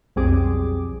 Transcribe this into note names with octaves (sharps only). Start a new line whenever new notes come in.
B1 F2 G3 C4 G#4 D6